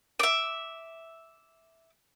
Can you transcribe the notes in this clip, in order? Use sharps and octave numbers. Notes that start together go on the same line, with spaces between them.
E5 D6